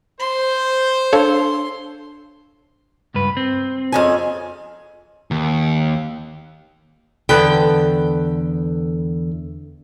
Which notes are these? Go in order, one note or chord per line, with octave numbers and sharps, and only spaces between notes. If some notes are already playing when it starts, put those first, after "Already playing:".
C5 C6
D4 A4 C#5 F5 C6
C#2 G2 B4
C4
F2 C#3 G#5
D#2
E2 D3 B3 A4 B4 G5